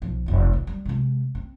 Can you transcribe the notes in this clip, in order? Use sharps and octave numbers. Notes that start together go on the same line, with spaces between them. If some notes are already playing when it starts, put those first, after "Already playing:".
B1 F3
F1 B1
E2
G3
C3 G#3
C4